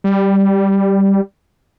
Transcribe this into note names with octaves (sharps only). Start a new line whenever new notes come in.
G3